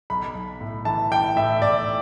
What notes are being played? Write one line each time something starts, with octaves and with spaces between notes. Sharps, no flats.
B1 B5
B1
A2
E3 A5
E3 G5
A2 E5
A2 D5